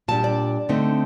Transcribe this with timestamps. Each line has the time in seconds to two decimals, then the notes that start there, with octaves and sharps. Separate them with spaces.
0.08 A#2 G3 D4 A5
0.24 D5
0.69 D3 A3 C4 D#4